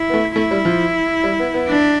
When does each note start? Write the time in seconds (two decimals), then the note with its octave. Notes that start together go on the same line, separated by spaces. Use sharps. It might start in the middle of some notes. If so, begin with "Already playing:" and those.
Already playing: E4
0.10 B3
0.14 A3
0.36 A3 E4
0.51 G3
0.65 F3
1.24 G3
1.39 B3
1.54 B3
1.68 D4